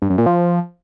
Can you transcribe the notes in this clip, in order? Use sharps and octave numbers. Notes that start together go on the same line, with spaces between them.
G2
F#2
A#2
F3